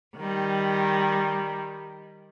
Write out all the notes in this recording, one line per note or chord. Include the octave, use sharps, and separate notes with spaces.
D#3 G3